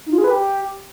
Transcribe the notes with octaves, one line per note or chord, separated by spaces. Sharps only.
D#4
F4
G#4
B4
G4